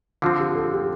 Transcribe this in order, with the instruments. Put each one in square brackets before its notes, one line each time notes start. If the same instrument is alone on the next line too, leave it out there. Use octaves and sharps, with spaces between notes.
[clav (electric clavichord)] D3 F3 C4 [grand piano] F4
[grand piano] G4
A4
G4